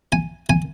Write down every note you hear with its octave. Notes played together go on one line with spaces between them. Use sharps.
G#5
G#5